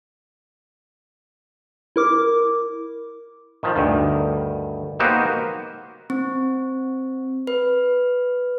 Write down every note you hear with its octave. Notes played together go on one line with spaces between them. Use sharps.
E4 A#4 D6
D#3 F3
D2 G2 D#3
A#3 B3 D#4 F#4 G4 C5
C4
B4